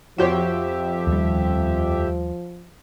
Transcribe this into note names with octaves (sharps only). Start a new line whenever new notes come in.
F2 F3 F#4 G4 C5 C#5 E5
D#2 G3